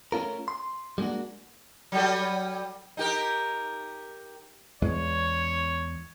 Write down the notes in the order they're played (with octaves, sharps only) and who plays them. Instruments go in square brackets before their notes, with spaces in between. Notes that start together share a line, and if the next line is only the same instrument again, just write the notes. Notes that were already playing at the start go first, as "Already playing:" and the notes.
[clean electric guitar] A3 C#4 F4 A#4
C6
G3 G#3 A#3 D4 F#4
[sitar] F#3 G3 A4
D#4 G4 A#4
[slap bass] E2 G#3 [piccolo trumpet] C#5